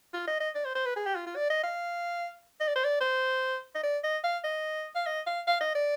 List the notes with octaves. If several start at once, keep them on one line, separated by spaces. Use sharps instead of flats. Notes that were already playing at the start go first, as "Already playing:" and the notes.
F4
D#5
D#5
D5
C5
C5
B4
G#4
G4
F4
F4
D5
D#5
F5
D#5
D5
C5
D5
C5
D#5
D5
D#5
F5
D#5
F5
D#5
F5
F5
D#5
D5